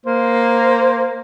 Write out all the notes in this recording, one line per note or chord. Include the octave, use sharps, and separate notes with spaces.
A#3 C5